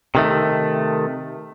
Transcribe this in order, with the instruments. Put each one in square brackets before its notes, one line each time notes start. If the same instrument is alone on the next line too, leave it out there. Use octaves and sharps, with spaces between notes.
[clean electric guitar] C3 D#3 A3